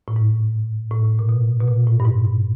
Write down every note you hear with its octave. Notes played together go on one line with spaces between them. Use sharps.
A2
G#2
A2
A#2
B2
B2
A#2
A2
G2
G#2
G#2